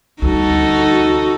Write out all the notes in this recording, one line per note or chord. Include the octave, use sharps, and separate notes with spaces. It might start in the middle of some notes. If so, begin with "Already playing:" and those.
D2 G3 D#4 F#4 A4